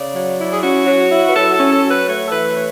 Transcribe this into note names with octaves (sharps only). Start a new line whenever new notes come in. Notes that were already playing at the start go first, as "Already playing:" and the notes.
Already playing: C#3 D5
F#3
E4
G#4
C#4 F#4
F#3
E4
B4
F#3 A4
A4
C#4
A4
F#3
B4
A3 C#5
A4
E3 B4
C#5